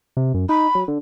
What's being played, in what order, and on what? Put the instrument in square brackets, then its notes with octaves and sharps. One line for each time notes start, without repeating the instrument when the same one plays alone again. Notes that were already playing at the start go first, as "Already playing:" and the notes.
[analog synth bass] C3
F#2
[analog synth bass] D#4 [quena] B5
[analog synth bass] F#3
D3